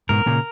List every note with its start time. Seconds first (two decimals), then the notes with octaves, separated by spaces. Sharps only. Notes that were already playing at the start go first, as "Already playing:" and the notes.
0.09 G#2 B2 A#4
0.26 A#2 C#3